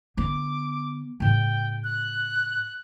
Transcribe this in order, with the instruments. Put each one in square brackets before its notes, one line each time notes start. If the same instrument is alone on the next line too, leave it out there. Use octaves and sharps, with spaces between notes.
[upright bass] D3 B3 [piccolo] D6
[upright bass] A2 C#3 [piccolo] G5
[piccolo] F#6